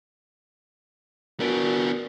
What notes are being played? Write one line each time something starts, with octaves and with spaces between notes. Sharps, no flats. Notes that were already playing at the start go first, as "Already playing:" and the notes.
B3 D4 F#4 A#4 D7